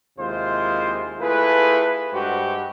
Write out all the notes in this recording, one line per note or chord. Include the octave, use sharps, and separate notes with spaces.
D#2 C3 G#3 E4 F4 C5
A3 E4 F4 G#4 B4
G2 G#3 F#4 G4 C5